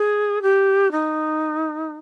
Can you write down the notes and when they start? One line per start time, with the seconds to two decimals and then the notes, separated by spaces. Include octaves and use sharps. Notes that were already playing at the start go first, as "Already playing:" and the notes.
Already playing: G#4
0.42 G4
0.91 D#4